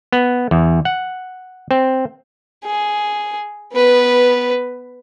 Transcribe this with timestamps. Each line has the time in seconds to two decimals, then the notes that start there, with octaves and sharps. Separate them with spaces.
0.13 B3
0.51 E2
0.85 F#5
1.71 C4
2.65 G#4
3.73 B3 B4